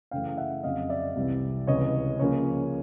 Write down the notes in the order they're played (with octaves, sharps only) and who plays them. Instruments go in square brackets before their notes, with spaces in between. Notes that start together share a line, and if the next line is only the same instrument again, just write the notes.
[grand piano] F#2 C#3 E3 A3 F5 G5
F5
E5 F#5
F2 C#3 F#3 D#5 F5
D5 E5
C2 C3 E3 G3
C#2 C3 E3 C#5 D#5
C#3 F3 A#3 C#5